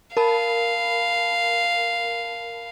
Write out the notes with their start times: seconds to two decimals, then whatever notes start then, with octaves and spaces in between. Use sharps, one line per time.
0.17 A#4 F5 A5 B5